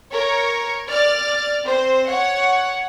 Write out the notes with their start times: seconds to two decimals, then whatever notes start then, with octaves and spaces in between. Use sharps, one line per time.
0.12 A#4 C#5
0.88 D5 F6 A6
1.65 C4 C5
2.09 C#5 F#5